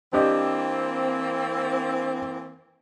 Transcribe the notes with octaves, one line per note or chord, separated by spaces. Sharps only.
E3 A#3 C4 D4 G4 D#5